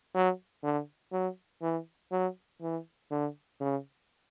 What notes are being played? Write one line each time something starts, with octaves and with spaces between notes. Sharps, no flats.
F#3
D3
F#3
E3
F#3
E3
D3
C#3